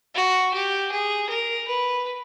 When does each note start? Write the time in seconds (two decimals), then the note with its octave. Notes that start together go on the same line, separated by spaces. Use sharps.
0.14 F#4
0.53 G4
0.91 G#4
1.29 A#4
1.67 B4